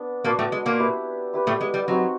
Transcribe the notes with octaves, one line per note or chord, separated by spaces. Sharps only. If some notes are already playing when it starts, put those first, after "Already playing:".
Already playing: B3 D4
A#2 A#3 B3 D4 F#4
A2 A3
G#3
A#2 A#3
E4 G4 B4
E4 G4 B4
A2 A3
G#3
G3
F#3 C4 D#4 F#4